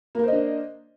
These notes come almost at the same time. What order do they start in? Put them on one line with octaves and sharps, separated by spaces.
A#3 A#4 C5 D#5 D4